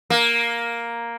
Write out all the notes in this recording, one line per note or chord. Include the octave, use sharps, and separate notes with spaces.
A#3